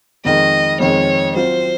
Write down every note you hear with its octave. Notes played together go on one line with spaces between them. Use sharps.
F2 D#3 G#3 D#5
F2 D#3 G#3 C#5
F#3 C4 F4 C5